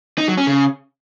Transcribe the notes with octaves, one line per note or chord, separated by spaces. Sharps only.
D#4
F#3
C#4
C#3